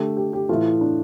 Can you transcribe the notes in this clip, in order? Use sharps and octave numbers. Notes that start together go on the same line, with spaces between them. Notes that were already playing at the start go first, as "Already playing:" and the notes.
Already playing: D3 A3 G4
G4
G4
A2 E3 A3 F4
D4